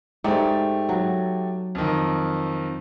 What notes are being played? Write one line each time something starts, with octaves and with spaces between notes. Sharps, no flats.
G#2 A3 G4 D5
F#3
F2 D#3